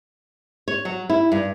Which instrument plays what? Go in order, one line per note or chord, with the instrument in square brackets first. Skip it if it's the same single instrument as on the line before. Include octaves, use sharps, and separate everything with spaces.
[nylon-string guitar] C#5
F#3
E4
G2